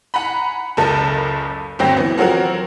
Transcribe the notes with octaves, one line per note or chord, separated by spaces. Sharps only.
F#5 G#5 A#5 B5
F#1 C#2 A4 A#4 A5
G1 D2 F#3 C4 G5 A#6
E3 B3
F3 F#3 C4 F#4 A#4